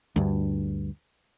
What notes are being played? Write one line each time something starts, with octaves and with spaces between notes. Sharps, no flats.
D2 G2